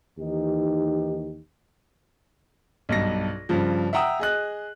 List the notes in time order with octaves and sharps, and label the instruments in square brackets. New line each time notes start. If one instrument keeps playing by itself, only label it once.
[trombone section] D#2 E3 D#4 G4
[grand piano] B1 G2 A#6
G2 C#3 F3
E5 F#5 G5 A#5 D#6 E6
G#4 D#5 F#6